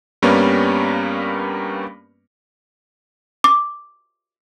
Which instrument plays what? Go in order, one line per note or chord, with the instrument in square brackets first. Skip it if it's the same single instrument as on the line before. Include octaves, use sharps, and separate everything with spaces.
[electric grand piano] G2 G3 A#3 B3 C#4
[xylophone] D6